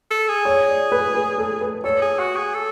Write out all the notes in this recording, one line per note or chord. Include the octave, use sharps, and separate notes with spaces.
A4
G#4
C#5
D5
B4
B4
A4
B4
A4 C#5
G#4
F#4
G#4
A4